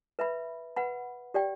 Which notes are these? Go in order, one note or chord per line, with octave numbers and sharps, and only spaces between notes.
B4 E5 B5
B4 F#5 B5
G4 D5 G5